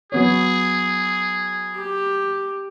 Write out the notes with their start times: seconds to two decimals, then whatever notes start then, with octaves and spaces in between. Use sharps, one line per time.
0.12 F#3 B3 G#4 C#5
1.76 G4